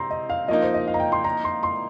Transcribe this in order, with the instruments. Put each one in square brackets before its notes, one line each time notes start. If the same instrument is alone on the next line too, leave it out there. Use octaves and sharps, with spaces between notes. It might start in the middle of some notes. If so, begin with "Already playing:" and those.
Already playing: [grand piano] C3 C4 [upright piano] A#5 C6
[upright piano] D#5
F5
[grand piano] F3 A#3 D#4 [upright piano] D#5
[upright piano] C5
D#5
F5
A#5
G5
C6
A#5
C6
C6